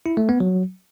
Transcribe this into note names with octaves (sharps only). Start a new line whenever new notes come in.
E4
A3
B3
F#3